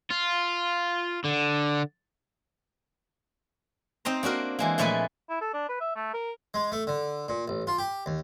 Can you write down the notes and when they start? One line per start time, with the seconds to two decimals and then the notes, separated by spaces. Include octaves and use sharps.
0.11 F4
1.24 D3
4.05 C4 D#4 C5 A#5
4.23 A#3 D4 F#4 A#4
4.59 E3 G#3 A#3
4.78 A#2 F3 G#3 A3 B4 G#5
5.30 E4
5.41 A4
5.54 D4
5.69 B4
5.81 E5
5.96 A3
6.14 A#4
6.54 G#3
6.72 A3
6.87 D3
7.28 A#2
7.48 A1
7.67 F4
7.78 G4
8.06 D#2